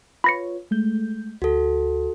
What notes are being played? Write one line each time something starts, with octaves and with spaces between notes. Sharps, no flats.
F4 B4 C#5 B5 A#6 C#7
G#3 A3 G6
D2 F#4 A4